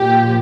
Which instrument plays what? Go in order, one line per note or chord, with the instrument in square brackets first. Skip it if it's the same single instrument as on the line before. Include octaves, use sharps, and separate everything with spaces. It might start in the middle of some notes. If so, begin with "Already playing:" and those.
Already playing: [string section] A#2 F3 G4